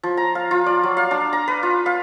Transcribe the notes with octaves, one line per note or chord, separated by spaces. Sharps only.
F3
A#5
F5
F4
D5
F#3
F5
D4
A#5
B4
F4
F5